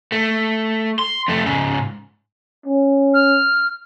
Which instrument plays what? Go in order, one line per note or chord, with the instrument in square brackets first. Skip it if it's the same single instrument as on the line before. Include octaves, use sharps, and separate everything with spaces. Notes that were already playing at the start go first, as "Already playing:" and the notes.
[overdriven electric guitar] A3
C6
F2 A3
G#2 C#3
[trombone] C#4
[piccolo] F6